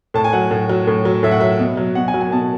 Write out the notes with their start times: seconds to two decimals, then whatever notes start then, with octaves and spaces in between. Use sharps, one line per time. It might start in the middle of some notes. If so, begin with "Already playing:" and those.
0.14 A2 A5
0.24 G#5
0.33 F#3 F#5
0.51 A2
0.69 F#3
0.87 A2
1.05 F#3
1.23 A2 E5
1.31 F#5
1.40 F#3 E5
1.59 B2
1.77 F#3
1.95 B2 F#5
2.08 G#5
2.14 F#3
2.21 G#5
2.32 B2 A5